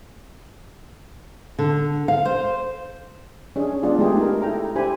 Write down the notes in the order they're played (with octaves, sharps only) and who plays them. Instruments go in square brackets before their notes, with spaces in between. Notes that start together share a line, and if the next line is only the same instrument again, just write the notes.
[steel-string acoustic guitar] D3
F5
C5
[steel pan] C#4 D4 G#4
G#3 B3 C#4 D4 F4 G#4
G#3 A3 B3 E4 G4 G#4
D#4 A#4
E4 A4 G5 A#5
D4 E4 G4 C5 G#5 B5